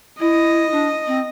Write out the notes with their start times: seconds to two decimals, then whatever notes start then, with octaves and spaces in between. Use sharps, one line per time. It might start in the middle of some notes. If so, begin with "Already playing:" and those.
0.20 E4 D#5
0.72 D4
1.07 C4